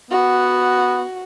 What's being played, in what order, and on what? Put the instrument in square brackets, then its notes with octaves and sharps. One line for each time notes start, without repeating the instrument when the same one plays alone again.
[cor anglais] B3 [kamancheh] F#4